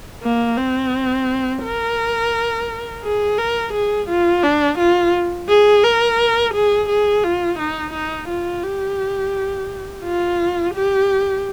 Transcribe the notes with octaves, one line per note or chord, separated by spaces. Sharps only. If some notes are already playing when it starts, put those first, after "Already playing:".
A#3
C4
A#4
G#4
A#4
G#4
F4
D4
F4
G#4
A#4
G#4
G#4
F4
D#4
D#4
F4
G4
F4
G4